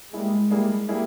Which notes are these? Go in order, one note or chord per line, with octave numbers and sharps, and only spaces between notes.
G3 G#3 A#3 E4 G#4
G3 A#3 E4 G#4
G3 A#3 E4 G#4